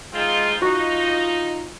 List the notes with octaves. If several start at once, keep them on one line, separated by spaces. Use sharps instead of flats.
G#3 C4 D#4 F4
D#4 F4 F#4